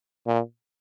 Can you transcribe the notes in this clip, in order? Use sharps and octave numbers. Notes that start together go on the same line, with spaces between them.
A#2